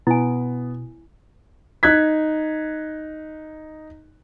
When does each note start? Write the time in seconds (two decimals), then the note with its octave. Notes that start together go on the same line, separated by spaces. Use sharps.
0.07 B2 B3 E4 G#5
1.83 D#4 F#6 G#6 B6